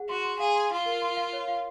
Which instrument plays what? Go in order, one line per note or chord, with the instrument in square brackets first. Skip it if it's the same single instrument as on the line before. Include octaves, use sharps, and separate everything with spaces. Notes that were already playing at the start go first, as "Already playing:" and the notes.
Already playing: [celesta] G#4 F#5
[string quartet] F#4 [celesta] C6
[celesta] C6
[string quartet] G#4 [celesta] F5
[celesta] C6
[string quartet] F4 [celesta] F5
[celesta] A#4
C6
F5
C#5
F5